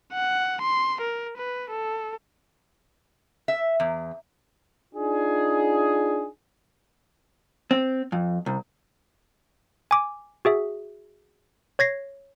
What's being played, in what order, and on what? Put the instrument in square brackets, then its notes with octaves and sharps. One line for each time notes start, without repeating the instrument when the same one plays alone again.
[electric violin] F#5
C6
A#4
B4
A4
[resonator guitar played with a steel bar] E5
E2
[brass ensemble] D4 D#4 F4 G#4
[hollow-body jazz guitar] C4
F2
C2
[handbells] G#5 D6
F#4 G#4 E5
C#5 G#6 A#6 C7